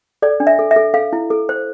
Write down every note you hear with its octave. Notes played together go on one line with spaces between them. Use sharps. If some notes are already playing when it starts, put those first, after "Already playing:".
A4 D5
D4
E5
A4
E5
A4
A4 F5
E4
A4
C5